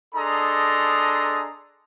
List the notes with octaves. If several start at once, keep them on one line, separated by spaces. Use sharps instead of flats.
D4 G#4 A4 D#5 A#5 C6